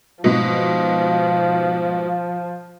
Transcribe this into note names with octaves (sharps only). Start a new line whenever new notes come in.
G#2 B2 F3